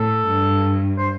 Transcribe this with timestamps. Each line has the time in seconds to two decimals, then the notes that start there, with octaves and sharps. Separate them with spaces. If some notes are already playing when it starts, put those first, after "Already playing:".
Already playing: A2 A4
0.27 G2
0.98 C5